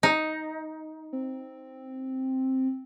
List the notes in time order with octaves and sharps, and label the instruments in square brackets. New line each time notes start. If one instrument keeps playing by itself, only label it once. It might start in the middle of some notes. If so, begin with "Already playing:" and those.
[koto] D#4
[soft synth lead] C4